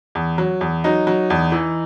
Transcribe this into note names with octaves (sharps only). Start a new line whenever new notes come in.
E2
F#3
E2
F#3 D#4
F#3
E2
E3